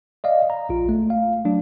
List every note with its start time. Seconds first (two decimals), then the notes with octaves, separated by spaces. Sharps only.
0.24 D5 D#5 F5
0.50 A#5
0.69 A#1 F4
0.89 A3
1.10 F5
1.45 F#3 A3 D4